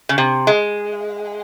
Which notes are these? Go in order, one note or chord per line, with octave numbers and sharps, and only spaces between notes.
C#3
C3
G#3